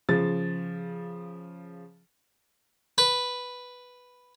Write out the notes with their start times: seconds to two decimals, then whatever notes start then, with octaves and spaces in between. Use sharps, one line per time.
0.09 C#3 F3 A6
2.98 B4